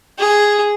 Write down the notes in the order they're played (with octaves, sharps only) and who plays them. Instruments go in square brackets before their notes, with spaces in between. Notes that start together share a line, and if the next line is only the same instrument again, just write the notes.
[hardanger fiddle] G#4